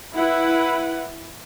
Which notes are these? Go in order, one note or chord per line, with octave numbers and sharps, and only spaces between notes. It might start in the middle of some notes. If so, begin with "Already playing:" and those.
E4 B4 F#5